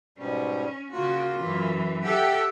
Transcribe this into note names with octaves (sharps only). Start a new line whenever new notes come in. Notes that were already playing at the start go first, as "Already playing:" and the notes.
G#2 B2 G3 C#4
C#3 A#3 F4 F#4
F#2 E3
G4 A4 E5 F#5 G5